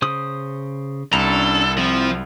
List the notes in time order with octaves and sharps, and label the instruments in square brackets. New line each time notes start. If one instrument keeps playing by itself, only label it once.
[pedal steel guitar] C#3 C5 D#6
[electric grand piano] C2 B5 [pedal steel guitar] C#4 D4 A#5 [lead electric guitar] A4
[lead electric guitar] F3 [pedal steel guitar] C4 E4